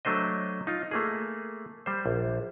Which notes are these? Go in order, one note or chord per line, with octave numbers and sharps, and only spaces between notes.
F#3 A3 D4 C5 D#5
D#4 F4
A3 A#3 G#4
G3 C5
A#1